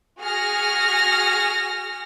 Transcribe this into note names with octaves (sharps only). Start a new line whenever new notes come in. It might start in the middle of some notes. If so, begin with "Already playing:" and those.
F#4 G#4 F6 A#6